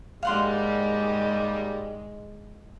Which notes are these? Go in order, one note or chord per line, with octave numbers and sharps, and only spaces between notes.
D#2 G#2 G3 G#3 F5 F#5 C6